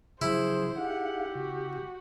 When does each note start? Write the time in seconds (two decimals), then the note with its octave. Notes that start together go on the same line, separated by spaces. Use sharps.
0.22 C#3 F3 F#3 E4 G#4 C5
0.78 D#4 G4 G#4 F5 F#5
1.35 C#3 F#4